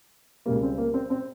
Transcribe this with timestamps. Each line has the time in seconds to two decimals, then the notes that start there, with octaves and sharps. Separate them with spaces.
0.46 C#2 C#3 G3 A#3
0.63 C4
0.78 A#3
0.94 C4
1.10 C4